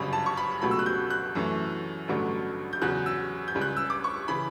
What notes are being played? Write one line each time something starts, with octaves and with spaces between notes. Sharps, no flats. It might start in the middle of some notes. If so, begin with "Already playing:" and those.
Already playing: G1 F#2 C#3 G3 B5
A5
C#6
B5
C#2 B2 F#3 A3 B5
E6
F#6
G6
F#6
F#2 E3 A3
A1 G2 D3 F#3 A3
G6
E2 C#3 F#3 F#6
E6
G6
C#2 C#3 G3
F#6
E6
D6
C#6
C#3 E3 B5